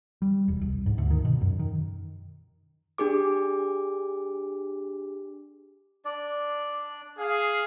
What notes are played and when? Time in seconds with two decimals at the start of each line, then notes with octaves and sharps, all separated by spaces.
0.22 G3
0.48 E1
0.61 C2
0.86 G#2
0.98 D2
1.11 D#3
1.25 B2
1.41 F#2
1.59 D#3
2.98 D4 G4 G#4 D6
6.05 D4 D5
7.19 G#4 F5